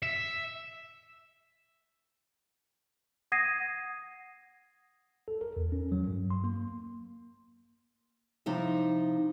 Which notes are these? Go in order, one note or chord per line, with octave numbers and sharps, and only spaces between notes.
E5
F#5 D#6 G#6 A#6 C7 D#7
A4
A#4
E2
C#4
F#3
G2
C6
A#3
C3 F3 D#4 E4 E5